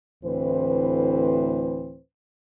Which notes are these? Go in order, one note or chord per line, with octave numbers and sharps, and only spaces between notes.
D2 A2 E3 C4 B4 C5